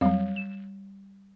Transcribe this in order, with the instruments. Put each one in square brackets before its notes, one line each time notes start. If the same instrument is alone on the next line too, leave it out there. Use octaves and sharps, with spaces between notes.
[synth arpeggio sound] F2 F#3 [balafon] G3 F5
[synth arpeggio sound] E7